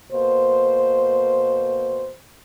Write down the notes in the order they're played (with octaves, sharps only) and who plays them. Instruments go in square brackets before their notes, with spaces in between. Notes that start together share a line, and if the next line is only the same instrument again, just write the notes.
[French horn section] B2 A#3 C5